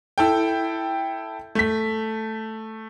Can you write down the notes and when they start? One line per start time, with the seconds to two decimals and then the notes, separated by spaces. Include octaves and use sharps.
0.18 E4 A4 G5
1.55 A3 B6